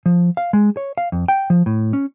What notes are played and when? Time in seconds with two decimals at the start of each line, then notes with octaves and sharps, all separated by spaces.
0.06 F3
0.37 F5
0.53 G#3
0.77 C#5
0.98 F5
1.12 F2
1.28 G5
1.50 F3
1.66 A2
1.93 C#4